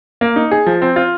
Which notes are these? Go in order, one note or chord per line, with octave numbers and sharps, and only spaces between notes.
A#3
D#4
G#4
F3
C4
F4